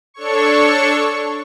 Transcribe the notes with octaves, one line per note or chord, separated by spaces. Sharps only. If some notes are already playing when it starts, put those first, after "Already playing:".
D4 A4 C#5 C#6